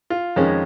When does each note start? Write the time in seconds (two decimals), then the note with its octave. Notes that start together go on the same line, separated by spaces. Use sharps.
0.10 F4
0.36 F2 D#3 G#3 C#4